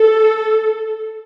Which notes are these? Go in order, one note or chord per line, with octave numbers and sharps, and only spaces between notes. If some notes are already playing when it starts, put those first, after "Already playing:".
Already playing: A4